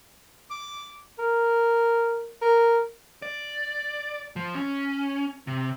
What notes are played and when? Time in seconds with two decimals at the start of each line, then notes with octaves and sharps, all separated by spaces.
0.51 D6
1.19 A#4
2.42 A#4
3.22 D5
4.36 F3
4.55 C#4
5.47 C3